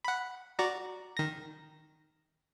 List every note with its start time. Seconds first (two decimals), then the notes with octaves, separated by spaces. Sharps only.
0.05 F#5 B5
0.59 F#4 D5 A#5
1.17 D#3 A#6